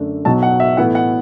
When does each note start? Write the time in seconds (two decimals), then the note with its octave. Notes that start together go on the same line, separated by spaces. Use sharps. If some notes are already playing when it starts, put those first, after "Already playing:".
Already playing: F#2 D3 A3 D4
0.25 B1 B2 F#3 A5
0.43 F#5
0.60 E5
0.77 A2 E3 B3 E4 F#5
0.95 F#5